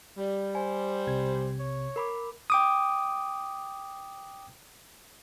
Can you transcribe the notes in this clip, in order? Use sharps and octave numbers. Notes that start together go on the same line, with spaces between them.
G3
C5 G#5
B1 C3 G#6
C#5
A#4 B5 D6
G5 D6 D#6